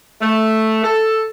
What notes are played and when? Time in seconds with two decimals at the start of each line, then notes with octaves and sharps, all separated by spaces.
0.21 A3
0.83 A4